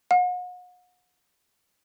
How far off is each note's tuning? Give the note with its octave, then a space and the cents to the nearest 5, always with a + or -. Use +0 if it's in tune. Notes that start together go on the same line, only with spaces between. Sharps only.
F#5 -40